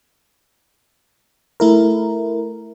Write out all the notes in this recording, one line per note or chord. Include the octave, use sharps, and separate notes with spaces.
A3 E4 A#4